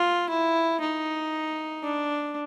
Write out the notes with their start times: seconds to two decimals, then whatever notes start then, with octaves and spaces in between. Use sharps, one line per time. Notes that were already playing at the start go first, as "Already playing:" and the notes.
Already playing: F4
0.29 E4
0.80 D#4
1.84 D4